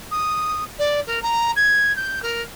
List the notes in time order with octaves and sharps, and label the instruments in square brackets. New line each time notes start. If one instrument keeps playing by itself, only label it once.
[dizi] D#6
D5
A#4
A#5
G#6
G6
A#4